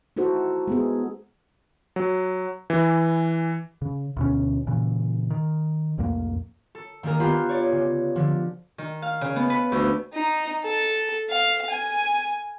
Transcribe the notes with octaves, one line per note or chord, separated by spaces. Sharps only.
D#4 E4 F#4 A4 C5
G#3 B3 G#4
F#3
E3
C#3
D2 B2 C#4
A#2 C#3 E3
D#3
C2 F2 A2 A#3
A4
D#3 A#3 D4 G#4 A#4
B3 F4 G4 B4
C#5 D5
C#3
D3 F3
D#3
F5
C#3
B3
B4
D2
D#4
A4
F5
G#5